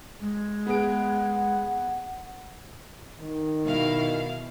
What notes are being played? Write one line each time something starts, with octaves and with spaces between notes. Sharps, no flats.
G#3
B3 G#4 F#5 D7
D#3
B2 E4 F5